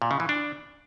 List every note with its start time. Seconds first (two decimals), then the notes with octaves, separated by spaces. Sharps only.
0.02 A#2
0.11 C#3
0.20 E3
0.29 D4